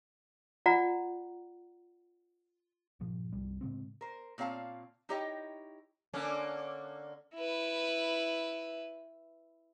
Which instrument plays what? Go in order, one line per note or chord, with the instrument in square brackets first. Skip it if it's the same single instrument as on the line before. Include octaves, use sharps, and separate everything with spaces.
[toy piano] F4 D5 F#5 A#5
[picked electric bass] G1 A#2 F3
G1 C2 G3
A2 C#3 G#3 C4
[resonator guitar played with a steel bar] A#4 C5
A#2 C4 C#5 F5 A5
D#4 E4 G4 C#5 D#5 G5
[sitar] D3 A#3 C#4
[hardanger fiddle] E4 B4